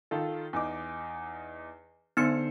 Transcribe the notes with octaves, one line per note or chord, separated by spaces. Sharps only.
D#3 F4 A4
E2 D#4 D6
D3 B3 D#4 C5 C#7